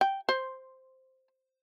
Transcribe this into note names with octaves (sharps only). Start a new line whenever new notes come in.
G5
C5